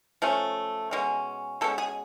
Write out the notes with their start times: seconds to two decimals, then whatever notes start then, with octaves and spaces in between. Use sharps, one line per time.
0.22 F3 A3 C#4
0.91 B2 G#3 C#4
1.61 B2 G#3 C#4 A4
1.78 G#4